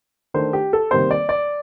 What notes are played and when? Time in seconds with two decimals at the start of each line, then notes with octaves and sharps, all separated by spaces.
0.34 D#3 A3 D4 C5
0.53 G4
0.73 A4
0.91 C3 D#3 G3 A#3 C5
1.11 D5
1.29 D5